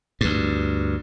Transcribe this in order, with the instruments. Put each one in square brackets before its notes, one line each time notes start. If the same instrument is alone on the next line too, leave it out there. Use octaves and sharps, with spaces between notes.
[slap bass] D2 G2